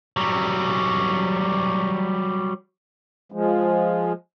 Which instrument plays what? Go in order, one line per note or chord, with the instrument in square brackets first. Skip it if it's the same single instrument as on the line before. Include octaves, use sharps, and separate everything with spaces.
[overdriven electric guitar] F#3 G3
[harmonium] F3 G#3